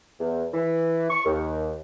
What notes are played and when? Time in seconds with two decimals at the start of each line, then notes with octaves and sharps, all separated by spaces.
0.20 E2
0.53 E3
1.10 C#6
1.25 D#2